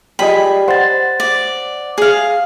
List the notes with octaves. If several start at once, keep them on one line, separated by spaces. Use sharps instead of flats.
F4 G4 G#4 D5 D#5 G5 B5
C5 F#5 A6
D5
G#4 F5